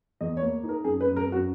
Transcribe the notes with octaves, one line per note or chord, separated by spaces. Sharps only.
E2 D#5
C#5
A#3
D#4
A#4
F#2 G#4
B4
F#2
A#4
F#2
F#4